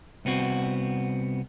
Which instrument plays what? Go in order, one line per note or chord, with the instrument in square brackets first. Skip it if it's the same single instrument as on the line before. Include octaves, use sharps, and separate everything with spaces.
[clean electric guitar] C2 B3 C4 F#4